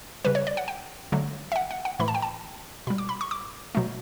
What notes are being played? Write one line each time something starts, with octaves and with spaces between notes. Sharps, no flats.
C#3 G3 B4
C#5
D5
F#5
G5
D3 F#3 A3
E5
F#5
F#5
F#5
A2 E3 A3 B5
A5
G5
A5
B2 G3 B5
D6
B5
C#6
D6
B2 F#3 A3